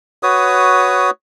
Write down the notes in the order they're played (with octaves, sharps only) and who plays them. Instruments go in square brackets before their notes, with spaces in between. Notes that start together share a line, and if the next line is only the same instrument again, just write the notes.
[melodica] F#4 B4 C#5 D#6